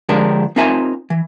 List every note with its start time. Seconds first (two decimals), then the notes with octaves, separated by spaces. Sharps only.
0.09 D3 F3 G#3 D4 G4 A#4
0.56 C4 D#4 F4 A#4 E5 G#5
1.10 E3